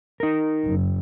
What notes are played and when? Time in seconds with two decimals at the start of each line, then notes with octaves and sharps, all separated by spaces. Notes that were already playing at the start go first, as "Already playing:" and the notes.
0.20 D#4 A#4
0.65 F#1